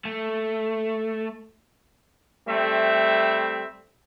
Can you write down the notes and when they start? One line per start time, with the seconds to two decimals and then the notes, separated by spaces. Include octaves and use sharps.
0.05 A3
2.48 G3 A3 C4 E5